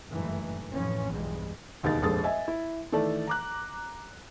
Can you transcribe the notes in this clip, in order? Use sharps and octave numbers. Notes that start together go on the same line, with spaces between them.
F#1 G2 A#2 D#3 E3 A3
F1 A2 E3 F3 C#4
B1 E2 G2 F3 G3 G#3
E1 D#2 D#4 G#4 A6
F1 A#1 G#3 A4 D#6 A6
D#5 E5 G#5
E4
D#3 E3 A3 A4 D5
A#5 D6 F#6